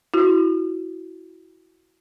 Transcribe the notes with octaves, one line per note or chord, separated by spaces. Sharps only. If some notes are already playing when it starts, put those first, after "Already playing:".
E4 F#4